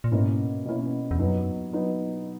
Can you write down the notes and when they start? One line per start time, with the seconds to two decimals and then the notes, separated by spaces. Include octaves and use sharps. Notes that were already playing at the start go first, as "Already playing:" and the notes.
0.04 A#2
0.11 G#2 B2 A#3 C#4 E4
0.65 B2 A#3 C#4 E4
1.11 E2
1.19 F#2 F#3 B3 D#4
1.73 F#3 B3 D#4